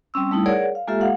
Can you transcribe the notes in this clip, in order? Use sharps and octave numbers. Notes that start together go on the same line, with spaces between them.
G3 C4 C#4 E6
G3 A3 D#4 E4
G#4 A#4 C#5 D5 F#5
F5
G#3 A#3 F4 G4 A4 E5
F5 F#5